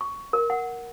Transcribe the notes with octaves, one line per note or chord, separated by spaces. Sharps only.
C#6
A#4
F#5